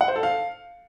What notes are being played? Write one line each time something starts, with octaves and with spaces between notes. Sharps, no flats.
F#5
C5
A4
F5